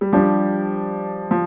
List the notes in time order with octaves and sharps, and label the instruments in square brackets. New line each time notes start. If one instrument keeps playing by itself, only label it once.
[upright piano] G3
[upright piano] F3 [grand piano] G3 D4 G4
[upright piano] F3